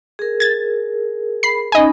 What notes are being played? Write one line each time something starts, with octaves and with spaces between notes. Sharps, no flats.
G#4 A#4
G#6 A6
B5 C7
C#4 D#4 D#5 G#5 B5